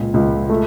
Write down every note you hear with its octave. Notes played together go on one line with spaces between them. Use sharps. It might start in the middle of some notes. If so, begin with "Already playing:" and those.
Already playing: C#2 A#2
C#2
A3